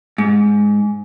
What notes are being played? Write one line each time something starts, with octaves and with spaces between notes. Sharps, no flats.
G#2